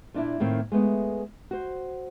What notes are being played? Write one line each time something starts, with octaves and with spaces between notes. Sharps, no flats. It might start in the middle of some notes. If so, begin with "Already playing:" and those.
A#2 D4 E4
A2 D#3 A#3 C4
G#3 A3 B3
F#4 C5